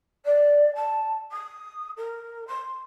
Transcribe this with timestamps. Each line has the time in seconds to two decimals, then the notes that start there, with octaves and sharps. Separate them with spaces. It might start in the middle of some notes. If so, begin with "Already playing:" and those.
0.25 D5
0.75 A5
1.31 D#6
1.96 A#4
2.47 C6